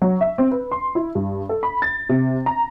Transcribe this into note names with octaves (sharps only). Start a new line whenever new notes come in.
F#3
E5
C4
B4
C6
E4
G2
A4
B5
A6
C3
A#5